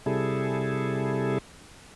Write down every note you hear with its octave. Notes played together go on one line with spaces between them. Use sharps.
C3 G3 E4 G#4 A4